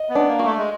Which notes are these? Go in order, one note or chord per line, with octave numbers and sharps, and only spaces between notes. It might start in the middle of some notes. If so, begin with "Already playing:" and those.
Already playing: D#5
B3
D4
A#3
F#4
A3
G#3